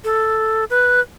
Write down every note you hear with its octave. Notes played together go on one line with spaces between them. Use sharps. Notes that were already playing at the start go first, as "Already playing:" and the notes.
A4
B4